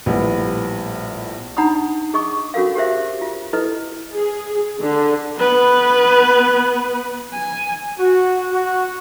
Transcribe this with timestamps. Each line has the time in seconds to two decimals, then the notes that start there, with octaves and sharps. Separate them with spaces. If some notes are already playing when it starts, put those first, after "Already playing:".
0.06 A#1 A2 G3 B3
1.57 D4 D#4 F#5 A#5 B5 D#6
2.14 G#4 D#5 C#6 D#6
2.54 C#4 F#4 A4 A#4 F5
2.75 G4 G#4 A#4 C5 E5
3.21 F4
3.53 E4 A4 B4 D#5
4.13 G#4
4.80 D3
5.38 B3 B4
7.33 G#5
7.99 F#4
8.52 F#4